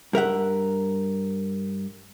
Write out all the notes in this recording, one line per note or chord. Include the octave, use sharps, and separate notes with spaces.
G2 A#4 E5 F#5